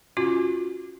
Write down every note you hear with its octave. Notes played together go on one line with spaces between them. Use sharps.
C#4 F4 F#4